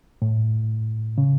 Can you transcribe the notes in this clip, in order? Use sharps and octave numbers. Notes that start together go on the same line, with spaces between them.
A2
C#3